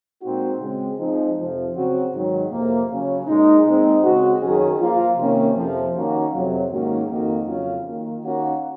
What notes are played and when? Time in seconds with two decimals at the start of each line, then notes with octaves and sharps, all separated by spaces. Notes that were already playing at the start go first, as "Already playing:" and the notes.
0.22 A#2 G#3 C4 D#4 F#4
0.60 C#3 G#3 C4
0.99 F3 G#3 C4 D#4
1.37 F2 C3 F3
1.74 C#3 F#3 C4 F#4
2.13 G#2 D#3 F#3
2.51 F2 C3 F3 A#3
2.89 C#3 F#3 C#4
3.27 A#2 G#3 D#4
3.65 A#2 G#3 C4 D#4
4.04 C#3 G#3 C4 F#4
4.42 F#2 D#3 F#3 C#4 G#4
4.80 F3 A#3 F4
5.18 C3 D#3 A#3 C#4
5.56 F2 C3 F3
5.95 D#3 A#3 C#4 F#4
6.33 F2 C3 F#3
6.71 G#2 D#3 A#3 C#4 F#4
7.09 F2 D#3 A#3 D#4 F#4
7.47 F2 C#3 F#3 C#4 F4
7.85 D#3 A#3 F4
8.23 D#3 A#3 C#4 F#4